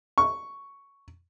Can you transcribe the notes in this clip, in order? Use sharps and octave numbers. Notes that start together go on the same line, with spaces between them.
C#6